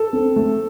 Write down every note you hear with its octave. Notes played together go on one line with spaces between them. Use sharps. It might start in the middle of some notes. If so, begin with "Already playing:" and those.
Already playing: A4
C4
A3